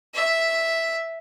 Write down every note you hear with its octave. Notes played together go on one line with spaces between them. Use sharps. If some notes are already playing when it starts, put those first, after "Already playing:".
E5